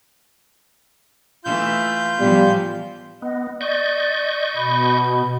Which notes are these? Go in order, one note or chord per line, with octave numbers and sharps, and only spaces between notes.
E3 A3 F4 G6
A2 E3 F3 G3 B3
B3 D#5
D5 D#5 C#6 G6
B2 B5